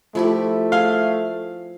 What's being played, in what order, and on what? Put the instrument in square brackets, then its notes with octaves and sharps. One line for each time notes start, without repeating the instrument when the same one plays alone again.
[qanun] F3 E4 G4 [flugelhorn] A3
[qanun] G#4 C6 [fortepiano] F5